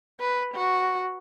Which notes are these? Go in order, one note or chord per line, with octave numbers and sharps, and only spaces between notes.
B4
F#4